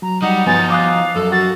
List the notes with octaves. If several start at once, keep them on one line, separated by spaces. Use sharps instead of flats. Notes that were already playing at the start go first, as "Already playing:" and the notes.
F#3 A#5
G3 D#4 F#5
G2 F3 B3 F#4 G#5 A6
F5 D6 D#6 F#6
F#2 A4
F#4 A6